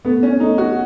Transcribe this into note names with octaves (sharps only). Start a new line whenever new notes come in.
A3 B3
C#4
A3 D#4
F#4